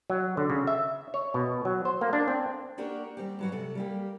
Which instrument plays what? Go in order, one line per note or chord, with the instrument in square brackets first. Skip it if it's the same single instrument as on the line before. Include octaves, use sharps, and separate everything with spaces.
[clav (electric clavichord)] F#3
D3
C#3
E5
C#5
B2
F#3
C5
A#3
D4
C4
[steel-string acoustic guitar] A#3 D4 F#4 G4 A#4
G3 C4 G4
G2 F#3 F#4
C3 A4
G3 A#3 G4